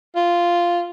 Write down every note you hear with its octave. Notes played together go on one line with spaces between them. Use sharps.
F4